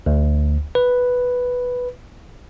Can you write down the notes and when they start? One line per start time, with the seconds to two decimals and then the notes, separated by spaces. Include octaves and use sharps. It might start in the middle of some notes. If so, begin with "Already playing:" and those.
0.06 D2
0.75 B4